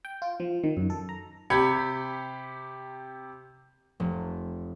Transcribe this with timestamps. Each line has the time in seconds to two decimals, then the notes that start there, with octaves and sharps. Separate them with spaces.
0.05 G5
0.22 F4
0.40 F3
0.64 D#3
0.77 F#2
0.90 A4
1.09 A#5
1.50 C3 G4 B5 G#6 C#7
4.00 F1